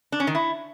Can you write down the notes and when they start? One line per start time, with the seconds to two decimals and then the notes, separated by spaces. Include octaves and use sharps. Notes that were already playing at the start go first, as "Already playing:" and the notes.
0.12 D4
0.20 C#4
0.27 D#3
0.35 E4